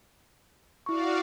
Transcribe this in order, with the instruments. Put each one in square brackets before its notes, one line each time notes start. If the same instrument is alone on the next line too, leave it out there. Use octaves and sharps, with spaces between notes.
[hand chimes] E4 C#6 [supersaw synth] F#4 D5 F5